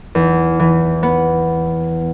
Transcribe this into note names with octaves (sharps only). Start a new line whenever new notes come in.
E2
E3
B3